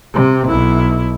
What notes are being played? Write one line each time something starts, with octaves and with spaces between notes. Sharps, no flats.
C3
B1 E4